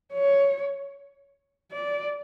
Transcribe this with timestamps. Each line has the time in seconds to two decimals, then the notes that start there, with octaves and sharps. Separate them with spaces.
0.13 C#5
1.72 D5